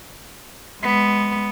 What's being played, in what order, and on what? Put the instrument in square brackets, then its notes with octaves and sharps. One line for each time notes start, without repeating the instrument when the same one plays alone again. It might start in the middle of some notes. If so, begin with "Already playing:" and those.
[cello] G#3 B3